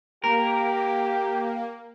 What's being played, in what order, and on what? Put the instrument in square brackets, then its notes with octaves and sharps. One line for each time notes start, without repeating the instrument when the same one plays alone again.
[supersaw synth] A#3 [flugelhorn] G4 [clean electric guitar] A#4